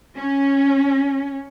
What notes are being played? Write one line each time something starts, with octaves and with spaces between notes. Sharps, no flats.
C#4